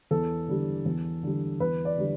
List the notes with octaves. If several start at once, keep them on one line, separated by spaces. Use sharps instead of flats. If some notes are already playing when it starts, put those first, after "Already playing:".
E2 A4
D3 G3
E2
D3 G3
E2 B4
D5
D3 G3